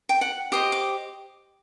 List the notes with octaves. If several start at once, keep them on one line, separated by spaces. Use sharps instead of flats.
G5
F#5
G4 C5 D#5 D#6
D6